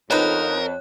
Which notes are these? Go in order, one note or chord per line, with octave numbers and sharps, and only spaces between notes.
F2 D3 B3 D#4 A#4 C#5 F#6